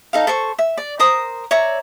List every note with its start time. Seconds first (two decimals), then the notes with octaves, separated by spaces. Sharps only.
0.13 D#4 A4 F5
0.27 A4 C5 C#6
0.59 E5
0.78 D5
0.99 A#4 C5 A#5 D#6
1.51 C#5 D5 E5 A#5